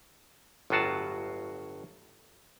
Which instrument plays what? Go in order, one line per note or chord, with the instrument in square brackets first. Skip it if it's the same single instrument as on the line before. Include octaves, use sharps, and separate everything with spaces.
[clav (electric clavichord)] G1 A2 F#3 F4 F#4 A5